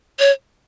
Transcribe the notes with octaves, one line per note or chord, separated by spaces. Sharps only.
C#5